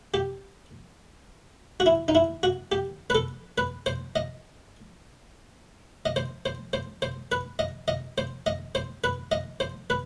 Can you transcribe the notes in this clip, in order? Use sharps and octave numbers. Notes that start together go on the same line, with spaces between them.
G4
F#4
E4
D#4
E4
F#4
G4
B4
A4
B4
C5
D#5
D#5
C5
C5
C5
C5
B4
D#5
D#5
C5
D#5
C5
B4
D#5
C5
B4